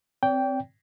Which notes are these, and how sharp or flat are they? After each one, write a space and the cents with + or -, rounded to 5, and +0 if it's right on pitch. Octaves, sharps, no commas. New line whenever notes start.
C4 +0 D5 -45 G5 +0